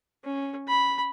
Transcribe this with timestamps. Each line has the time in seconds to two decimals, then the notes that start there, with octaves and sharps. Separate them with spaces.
0.24 C#4
0.68 B5